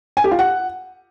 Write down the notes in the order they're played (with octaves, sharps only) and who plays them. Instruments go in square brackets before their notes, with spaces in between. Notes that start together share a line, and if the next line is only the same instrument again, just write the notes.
[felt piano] G#5
G4
F4
F#5